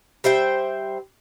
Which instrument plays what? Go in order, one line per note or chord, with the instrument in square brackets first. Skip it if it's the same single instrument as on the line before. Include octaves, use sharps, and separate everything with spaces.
[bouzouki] G3 C5 E5 G5